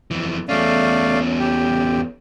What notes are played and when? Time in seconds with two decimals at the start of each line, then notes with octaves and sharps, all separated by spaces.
0.11 F2 E3
0.49 E2 A3 C#4 D5 F5
1.39 G4